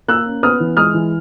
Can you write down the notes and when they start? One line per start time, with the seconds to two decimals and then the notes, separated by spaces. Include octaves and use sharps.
0.08 A#3 E6 F#6
0.26 C#4
0.43 B3 D#6 F6
0.60 E3
0.77 G#3 D#6 F6
0.94 E3